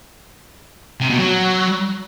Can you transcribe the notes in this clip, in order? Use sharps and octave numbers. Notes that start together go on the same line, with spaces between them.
C3
B2
F#3